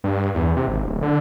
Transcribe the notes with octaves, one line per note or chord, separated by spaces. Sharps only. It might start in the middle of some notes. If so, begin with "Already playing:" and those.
G2
E2
C3
G#1
D1
D3